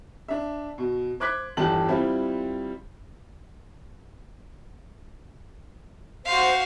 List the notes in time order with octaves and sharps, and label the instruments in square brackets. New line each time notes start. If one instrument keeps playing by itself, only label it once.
[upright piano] D4 E5
B2
C5 D6 F#6 G#6 B6
G1 E2 D3 G4 A5 F#7
G3 C4 E4 F4 C5
[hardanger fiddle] F#4 F5 [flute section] C5